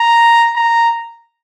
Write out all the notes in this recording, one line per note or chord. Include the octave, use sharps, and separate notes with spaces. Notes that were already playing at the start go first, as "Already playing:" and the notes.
Already playing: A#5
A#5